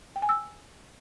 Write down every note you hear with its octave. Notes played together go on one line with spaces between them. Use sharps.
G5
G#5
E6